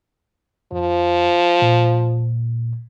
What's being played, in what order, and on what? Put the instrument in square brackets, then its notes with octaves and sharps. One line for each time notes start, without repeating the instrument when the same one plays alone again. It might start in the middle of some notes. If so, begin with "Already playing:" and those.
[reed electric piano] F2 [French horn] F3
[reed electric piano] A#2